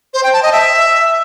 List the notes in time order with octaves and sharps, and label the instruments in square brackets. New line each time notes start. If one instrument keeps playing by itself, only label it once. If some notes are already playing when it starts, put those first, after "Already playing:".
[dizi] C5
G5
A5
D#5
E5